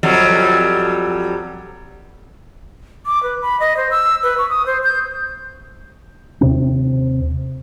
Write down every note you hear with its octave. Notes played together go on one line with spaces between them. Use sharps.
F2 F#3 G3
D6
B4
B5
D#5
C5
E6
B4
C#6
D#6
C5
G6
D#2 C3 C4